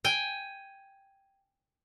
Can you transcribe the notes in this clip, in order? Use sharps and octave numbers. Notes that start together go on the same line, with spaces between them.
G5 G#5